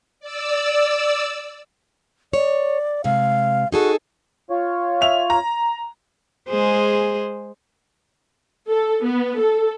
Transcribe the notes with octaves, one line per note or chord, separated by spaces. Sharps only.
D5 E6
C#5 D5
C3 G#3 F5
D#4 F#4 G#4 A4
F4 C#5
E5 F7
A#5
G#3 G#4 C5
A4
B3
A4